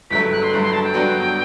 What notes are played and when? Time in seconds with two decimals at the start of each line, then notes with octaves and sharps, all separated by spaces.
0.10 G1 G2 F#3 A3 B6
0.32 F#6
0.43 C6
0.52 G1 G2 F#3 A3
0.63 C6
0.73 A5
0.84 G5
0.94 G2 F#3 B3 D4 F#4